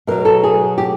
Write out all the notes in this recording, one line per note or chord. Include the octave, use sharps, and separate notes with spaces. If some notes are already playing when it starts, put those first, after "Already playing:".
B2 F#3 A#4
A4
G#4
G4